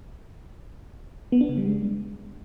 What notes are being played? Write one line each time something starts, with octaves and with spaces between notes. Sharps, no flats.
B3
D4
C#3
G3
G#3